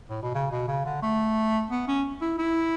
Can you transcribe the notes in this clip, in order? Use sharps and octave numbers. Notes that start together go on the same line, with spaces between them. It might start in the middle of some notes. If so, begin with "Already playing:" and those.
A2
B2
C#3
B2
C#3
D3
A3
B3
C#4
E4
E4